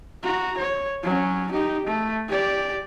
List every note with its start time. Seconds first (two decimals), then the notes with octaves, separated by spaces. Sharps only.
0.23 F#4 A#5
0.58 C#5
1.03 F#3 C#4
1.52 D#4 G4
1.87 A3
2.28 G4 D5